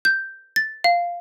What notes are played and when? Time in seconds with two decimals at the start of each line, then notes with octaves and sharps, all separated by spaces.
0.05 G6
0.56 A6
0.84 F5